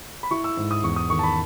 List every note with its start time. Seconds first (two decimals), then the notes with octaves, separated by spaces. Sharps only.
0.23 B5
0.31 E4 C#6
0.44 E6
0.57 G#2
0.71 D#6
0.83 E2 C#6
0.96 D#6
1.10 D#3 C#6
1.19 A5
1.23 B5